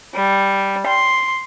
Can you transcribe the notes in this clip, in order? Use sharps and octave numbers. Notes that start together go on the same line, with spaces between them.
G3
C6